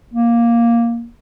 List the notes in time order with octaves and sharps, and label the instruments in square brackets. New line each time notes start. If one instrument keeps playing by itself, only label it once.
[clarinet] A#3